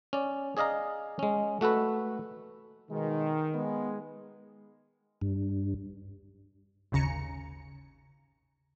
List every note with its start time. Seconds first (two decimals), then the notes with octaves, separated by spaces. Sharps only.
0.13 C#4 D5
0.57 G#4 D5 D#5 F5 A#5
1.19 G#3 C#4
1.61 A3 F#4 A4 B4
2.91 B2 D#3 G#3
3.54 G#3 B3
5.21 G2
6.92 G#1 D#2 C#3 A#5 C#7